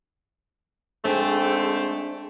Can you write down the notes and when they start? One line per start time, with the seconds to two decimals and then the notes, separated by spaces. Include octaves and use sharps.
1.05 G#2 A3 C4 D4 G#4 C5